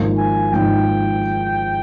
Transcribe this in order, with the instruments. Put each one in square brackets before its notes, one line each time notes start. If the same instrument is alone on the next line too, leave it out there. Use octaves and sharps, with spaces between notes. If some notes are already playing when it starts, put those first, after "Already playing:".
Already playing: [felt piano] G#1 G#2 F3 A#3
[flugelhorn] G#5
[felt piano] G#1 G#2 F3 A#3 [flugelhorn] G5